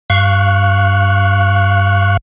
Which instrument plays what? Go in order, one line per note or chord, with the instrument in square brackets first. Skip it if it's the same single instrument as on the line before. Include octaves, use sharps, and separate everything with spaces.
[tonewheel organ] G2 F5 C#6 F#6